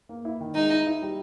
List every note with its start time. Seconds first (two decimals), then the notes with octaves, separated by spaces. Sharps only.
0.09 A#3
0.25 E4
0.41 D#3
0.55 G#3 D#4
0.70 E4
0.87 E4
1.02 G3